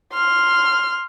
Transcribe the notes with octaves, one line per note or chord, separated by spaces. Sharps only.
C6 F6